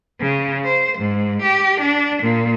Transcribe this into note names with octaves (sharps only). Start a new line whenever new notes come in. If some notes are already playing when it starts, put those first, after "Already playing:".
C#3
C5
G#2
G4
D4
A#2